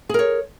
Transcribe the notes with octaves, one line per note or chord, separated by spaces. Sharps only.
G#4 A#4 C#5